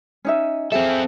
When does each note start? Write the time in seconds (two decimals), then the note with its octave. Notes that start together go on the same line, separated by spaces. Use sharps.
0.25 C#4 D#4 E5
0.72 C4 G#4 A4 E5